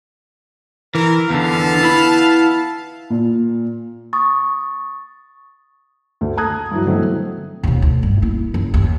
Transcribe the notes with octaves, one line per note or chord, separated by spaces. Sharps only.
E3 A#4
E2 D3 B3 F5 A5
E4 B5
A#2
C#6 D#6 A6
D2
A5 A#5 D#6 F#6 G#6
G2 E3 F#3
B2 D3 E3 F#3 A3 C4
D#2 B2
D2
G2
A#3 E4
F#1 D#2
D#2